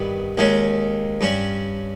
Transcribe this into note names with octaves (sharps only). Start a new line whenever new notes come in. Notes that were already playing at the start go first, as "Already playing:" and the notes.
Already playing: G2 D#3 G3 B3
D#2 D#3 G#3 C#4
G2 G3 C#4